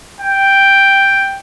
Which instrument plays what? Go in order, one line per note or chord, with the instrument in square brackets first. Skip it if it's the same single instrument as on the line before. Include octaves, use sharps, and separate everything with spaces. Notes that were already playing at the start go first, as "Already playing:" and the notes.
[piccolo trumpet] G5